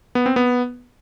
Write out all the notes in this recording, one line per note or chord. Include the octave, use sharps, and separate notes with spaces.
B3
C4
B3